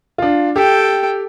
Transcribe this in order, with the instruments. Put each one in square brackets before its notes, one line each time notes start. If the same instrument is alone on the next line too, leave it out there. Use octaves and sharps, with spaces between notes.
[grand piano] D4 F4
[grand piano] G4 [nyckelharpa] A4 G5